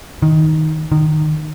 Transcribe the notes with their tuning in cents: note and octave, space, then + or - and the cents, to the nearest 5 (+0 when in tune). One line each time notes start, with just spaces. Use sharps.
D#3 +10
D#3 -20